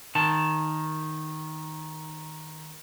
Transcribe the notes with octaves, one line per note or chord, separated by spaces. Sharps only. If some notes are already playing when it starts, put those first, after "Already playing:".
D#3 A5